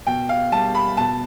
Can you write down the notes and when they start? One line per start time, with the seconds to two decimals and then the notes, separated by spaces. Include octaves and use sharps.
0.07 B2 G5
0.29 F5
0.52 G3 A5
0.75 B5
0.97 B2 A5